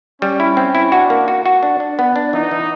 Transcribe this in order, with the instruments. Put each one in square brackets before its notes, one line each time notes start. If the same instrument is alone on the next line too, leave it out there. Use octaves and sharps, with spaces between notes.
[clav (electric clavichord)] G3 [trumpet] C#4
[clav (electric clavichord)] E4
C4
E4
[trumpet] D4 [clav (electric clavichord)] F#4
[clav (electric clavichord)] A#3
F#4
F#4
D4
D4
B3
D4
[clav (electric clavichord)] E3 [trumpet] D#4
[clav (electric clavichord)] E3